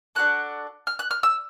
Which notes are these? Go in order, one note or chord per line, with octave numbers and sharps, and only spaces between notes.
D4 F#4 A4 F#6
F6
F#6
F6
E6